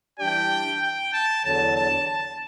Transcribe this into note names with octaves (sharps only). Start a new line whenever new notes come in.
E3 G3 D4 G4 D5 G5
G5
A5
E2 D3 F#3 A5
A5
A5